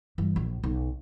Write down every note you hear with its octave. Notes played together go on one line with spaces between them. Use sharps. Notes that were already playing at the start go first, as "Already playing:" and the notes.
G2 E3
A#1
B1